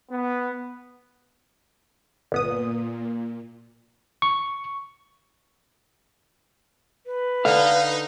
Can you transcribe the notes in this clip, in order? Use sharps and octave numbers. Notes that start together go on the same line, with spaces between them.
B3
G1 A#2 B3 D#6
C#6
B4
D3 D#4 F5